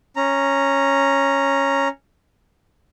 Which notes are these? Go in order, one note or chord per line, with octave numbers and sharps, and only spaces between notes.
C#4 A#5